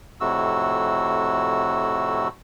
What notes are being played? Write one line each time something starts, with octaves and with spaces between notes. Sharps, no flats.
F2 A2 C3 F#4 E6